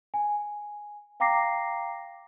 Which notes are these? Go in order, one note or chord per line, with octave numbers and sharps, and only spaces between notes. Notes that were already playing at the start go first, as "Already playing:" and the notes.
G#5
F5 G5 A#5 D6 A#6 C7